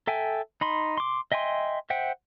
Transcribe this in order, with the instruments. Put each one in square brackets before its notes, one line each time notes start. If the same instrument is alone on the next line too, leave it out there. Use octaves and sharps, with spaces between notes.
[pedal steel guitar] A4 E5 G5 G#5
D#4 B5 C6
C6 D6
D#5 E5 G5 G#5 C6
C5 E5 F#5 G5